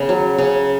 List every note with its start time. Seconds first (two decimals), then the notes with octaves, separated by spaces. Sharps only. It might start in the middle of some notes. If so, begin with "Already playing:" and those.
Already playing: C#3 B3 G5
0.09 F#3
0.38 C#3